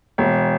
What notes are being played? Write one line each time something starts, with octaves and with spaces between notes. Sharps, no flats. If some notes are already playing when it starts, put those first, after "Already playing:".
E1